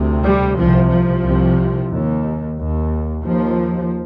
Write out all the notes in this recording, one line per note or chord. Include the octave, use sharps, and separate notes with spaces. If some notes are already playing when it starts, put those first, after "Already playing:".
Already playing: D2 C3
G3
C2 C3 F3
F3
C2 C3
D#2
D#2
D#2 F3